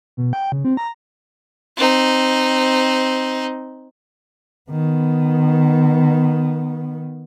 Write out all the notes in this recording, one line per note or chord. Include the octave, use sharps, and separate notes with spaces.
B2
G5
C#3
C4
A#5
C4 D#4
D#3 B3